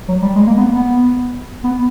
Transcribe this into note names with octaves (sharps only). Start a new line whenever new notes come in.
F#3
G3
G#3
A#3
B3
B3
B3